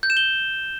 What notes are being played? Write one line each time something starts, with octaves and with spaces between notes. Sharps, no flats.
G6
E7
G7